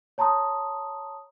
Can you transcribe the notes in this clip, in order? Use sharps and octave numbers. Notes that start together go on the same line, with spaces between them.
C#5 A5 A#5 C6 D#6